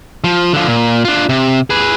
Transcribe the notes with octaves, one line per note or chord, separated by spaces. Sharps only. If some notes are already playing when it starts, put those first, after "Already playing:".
F3
D3 F3
A#2
D4 F4
C3
G#4 B4